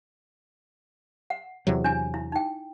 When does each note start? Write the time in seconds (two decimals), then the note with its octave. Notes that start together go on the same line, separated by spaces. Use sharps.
1.30 F#5
1.67 E2 C3 F#3
1.84 D4 E4 G#5
2.14 E4
2.32 D#4 G5